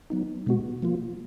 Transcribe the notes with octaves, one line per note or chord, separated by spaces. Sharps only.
F#3 B3 D#4
B2 G#3 B3 F#4
F3 A#3 F4